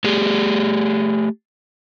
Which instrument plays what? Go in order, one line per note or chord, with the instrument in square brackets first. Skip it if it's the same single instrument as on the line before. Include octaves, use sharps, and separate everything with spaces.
[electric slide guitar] A3 G4 G#4